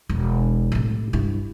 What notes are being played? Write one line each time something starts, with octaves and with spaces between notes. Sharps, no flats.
E1
A2 C3
G2 E4